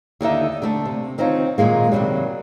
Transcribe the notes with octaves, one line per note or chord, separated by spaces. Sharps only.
D#2 D3 D#4 E5
D3 A3 A5
C3
D#3 C4 D#4 F4 C#5
A#2 D#3 G#3 A#3
C3 D#3 E3 F#3 G3